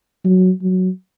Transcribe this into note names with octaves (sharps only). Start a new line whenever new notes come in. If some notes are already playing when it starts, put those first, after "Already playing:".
F#3
F#3